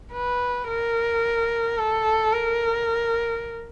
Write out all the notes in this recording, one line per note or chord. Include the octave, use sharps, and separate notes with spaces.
B4
A#4
A4
A#4